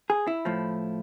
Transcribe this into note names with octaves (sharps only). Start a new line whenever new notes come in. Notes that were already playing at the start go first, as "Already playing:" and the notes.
G#4
E4
A2 F3